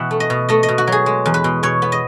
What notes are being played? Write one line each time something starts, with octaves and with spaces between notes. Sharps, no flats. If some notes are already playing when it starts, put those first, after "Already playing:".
Already playing: B2 E3 E5 F#5
A3
D#5
B2
A3 D#5
D#5
B2
F#4
F#3 G#4
G#3
E2
B4
B2
B2 C#5
B3
D#5